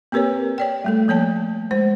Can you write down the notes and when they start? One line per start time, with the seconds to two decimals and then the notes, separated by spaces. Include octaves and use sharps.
0.12 A#3 C4 G4 A#4 B4 C#5
0.58 C#5 D5 G5
0.84 G3 A3 A4
1.08 F3 A#3 C#5 A5
1.71 G#3 C5